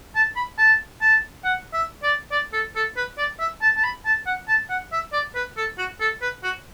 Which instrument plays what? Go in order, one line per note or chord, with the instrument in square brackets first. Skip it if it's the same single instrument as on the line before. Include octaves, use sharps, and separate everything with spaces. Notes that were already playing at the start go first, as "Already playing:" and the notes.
[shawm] A5
B5
A5
A5
F#5
E5
D5
D5
A4
A4
B4
D5
E5
A5
A5
B5
A5
F#5
A5
F#5
E5
D5
B4
A4
F#4
A4
B4
F#4